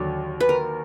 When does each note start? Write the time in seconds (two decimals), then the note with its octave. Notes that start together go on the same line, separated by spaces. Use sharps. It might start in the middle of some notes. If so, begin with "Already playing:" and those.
Already playing: D#2 D3 F#3 D5
0.40 B4
0.49 A#4